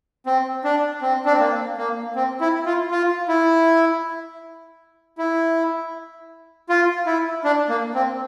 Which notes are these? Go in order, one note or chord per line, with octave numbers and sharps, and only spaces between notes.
C4
D4
C4
D4
C4
A#3
A#3
C4
E4
F4
F4
E4
E4
F4
E4
D4
A#3
C4